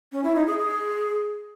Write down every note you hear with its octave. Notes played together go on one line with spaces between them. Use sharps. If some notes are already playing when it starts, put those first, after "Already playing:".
C#4
E4
D#4
G#4
G#4